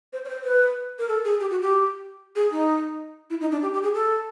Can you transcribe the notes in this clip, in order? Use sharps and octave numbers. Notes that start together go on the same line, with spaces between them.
C5
C#5
C5
B4
A#4
A4
G#4
G4
F#4
G4
G#4
D#4
E4
D#4
D4
G4
G4
G#4
A4